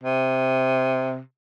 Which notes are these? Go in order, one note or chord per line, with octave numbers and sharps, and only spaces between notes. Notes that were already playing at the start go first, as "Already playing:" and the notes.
C3